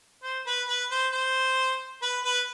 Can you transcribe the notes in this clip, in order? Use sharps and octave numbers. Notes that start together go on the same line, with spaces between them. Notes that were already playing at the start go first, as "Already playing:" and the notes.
C5
B4
B4
C5
C5
B4
B4